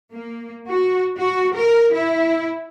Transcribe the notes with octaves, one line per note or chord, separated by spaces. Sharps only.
A#3
F#4
F#4
A#4
E4